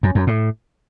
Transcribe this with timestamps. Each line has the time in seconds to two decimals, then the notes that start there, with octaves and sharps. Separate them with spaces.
0.03 F#2
0.15 F#2
0.27 A2